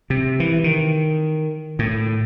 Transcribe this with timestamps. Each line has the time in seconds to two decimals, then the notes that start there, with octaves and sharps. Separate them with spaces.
0.10 C3
0.40 E3
0.64 D#3
1.79 A2